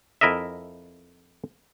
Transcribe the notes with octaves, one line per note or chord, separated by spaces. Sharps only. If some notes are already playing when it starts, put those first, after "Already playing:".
F2 E4 A#4 D#5 E5